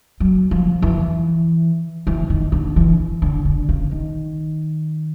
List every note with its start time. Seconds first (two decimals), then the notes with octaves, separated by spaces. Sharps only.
0.20 F#3
0.51 F3
0.82 E3
2.07 E3
2.30 D#3
2.52 D3
2.76 E3
3.22 D3
3.45 D3
3.69 C#3
3.91 D#3